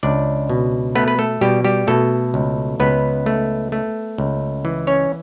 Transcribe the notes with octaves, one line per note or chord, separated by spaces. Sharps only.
C#2 D4 D5
B2
A3 B3 B4
B4
A3 A4
B2 G3 G4
G3 G4
B2 A3 A4
C#2
C#2 B3 B4
A3
A3
C#2
E3
C#4 C#5